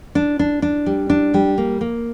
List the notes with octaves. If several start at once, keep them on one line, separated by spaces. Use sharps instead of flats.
D4
D4
D4
G3
D4
G3
A#3
A#3